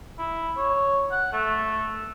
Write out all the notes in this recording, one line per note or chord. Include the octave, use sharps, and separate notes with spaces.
E4
C#5
F#5
A3